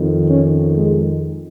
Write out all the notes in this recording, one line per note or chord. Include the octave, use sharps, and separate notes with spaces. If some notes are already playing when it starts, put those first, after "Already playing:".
Already playing: F2 D#3
C#4
G#3